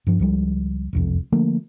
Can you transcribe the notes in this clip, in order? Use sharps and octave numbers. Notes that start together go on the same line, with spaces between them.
G2 F3
C#2 F3 G3
E1 C2 F2
D3 F3 A3 A#3